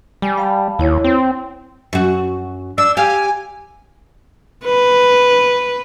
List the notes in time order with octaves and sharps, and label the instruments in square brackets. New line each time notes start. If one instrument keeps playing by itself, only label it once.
[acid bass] G3 [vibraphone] G#5
[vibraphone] F5 A5 B5
[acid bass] D#2 [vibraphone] E4 C#5
[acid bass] C4
[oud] F#2 F#4
[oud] D4 [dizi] E6
[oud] G4 F5 [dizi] G#5
[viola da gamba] B4